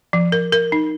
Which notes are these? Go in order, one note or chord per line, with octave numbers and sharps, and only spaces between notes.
F3
A#4
A#4
D#4